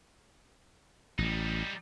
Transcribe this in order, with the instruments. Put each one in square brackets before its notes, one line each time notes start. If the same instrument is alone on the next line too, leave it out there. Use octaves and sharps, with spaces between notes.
[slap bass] A1 [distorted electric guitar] G3 D#4